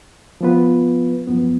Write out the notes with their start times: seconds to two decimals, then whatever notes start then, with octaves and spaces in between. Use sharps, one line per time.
0.41 F3 B3 F4 B4
1.27 F#2 F3 B3